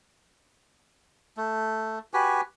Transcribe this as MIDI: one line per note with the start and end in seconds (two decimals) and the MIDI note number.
1.37 1.99 57
2.14 2.41 66
2.14 2.41 67
2.14 2.41 71
2.14 2.41 80